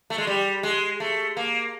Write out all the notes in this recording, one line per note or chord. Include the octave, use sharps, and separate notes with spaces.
A3
G#3
G3
G#3
A3
A#3